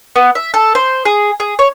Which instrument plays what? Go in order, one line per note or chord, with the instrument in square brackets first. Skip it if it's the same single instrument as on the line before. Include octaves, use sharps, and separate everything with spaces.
[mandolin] B3
E5
A4
C5
G#4
G#4
C#5